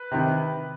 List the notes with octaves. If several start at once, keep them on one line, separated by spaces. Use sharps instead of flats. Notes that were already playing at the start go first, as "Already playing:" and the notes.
Already playing: B4
C3 D#3